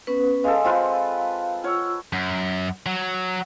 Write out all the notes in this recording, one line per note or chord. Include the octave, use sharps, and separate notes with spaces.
B3 C#4 B4
G#3 A4 F5
C4 F4 B4
F4 C#5 F#5 E6
F#2
F#3